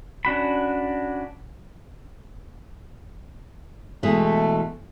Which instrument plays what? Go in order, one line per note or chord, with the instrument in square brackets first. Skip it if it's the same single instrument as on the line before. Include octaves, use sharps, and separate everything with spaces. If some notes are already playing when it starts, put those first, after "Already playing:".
[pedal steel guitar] C#4 D4 F#4 B5
[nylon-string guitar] B2 E3 G#3 [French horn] A3